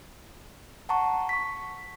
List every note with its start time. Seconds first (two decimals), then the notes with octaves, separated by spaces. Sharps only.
0.89 F#5 A5 A#5 C#6
1.29 C#6 B6